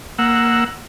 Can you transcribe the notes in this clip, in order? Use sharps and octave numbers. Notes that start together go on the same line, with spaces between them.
A#3 F#5 E6